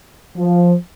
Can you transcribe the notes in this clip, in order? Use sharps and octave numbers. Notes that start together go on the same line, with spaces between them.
F3